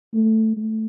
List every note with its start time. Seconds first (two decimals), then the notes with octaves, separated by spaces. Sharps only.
0.14 A3
0.57 A3